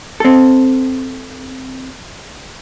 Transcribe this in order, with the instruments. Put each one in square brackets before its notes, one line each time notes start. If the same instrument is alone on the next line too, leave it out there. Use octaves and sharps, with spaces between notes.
[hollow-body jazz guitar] C4 A4